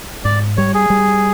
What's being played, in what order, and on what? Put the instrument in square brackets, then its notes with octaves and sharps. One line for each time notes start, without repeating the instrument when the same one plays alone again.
[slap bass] G#2 [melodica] D5
[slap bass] G3 [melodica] C#5
[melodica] G#4
[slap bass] G3